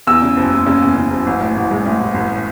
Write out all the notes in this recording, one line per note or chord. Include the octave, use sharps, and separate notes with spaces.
E2 E6
C#3
F#1
F#1
C#3
E2
C#3
F#1
A1
A2
A1
G#3
A2
A1
A1